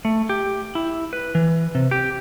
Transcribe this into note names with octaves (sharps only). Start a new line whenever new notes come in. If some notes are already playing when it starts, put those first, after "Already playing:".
A3
G4
E4
B4
E3
C3
G4